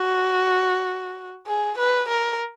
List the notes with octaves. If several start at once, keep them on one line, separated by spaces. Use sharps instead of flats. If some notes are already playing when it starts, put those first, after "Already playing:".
Already playing: F#4
G#4
B4
A#4